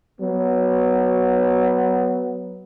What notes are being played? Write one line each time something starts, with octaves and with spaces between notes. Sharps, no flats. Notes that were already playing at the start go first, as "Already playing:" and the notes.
F#3 B3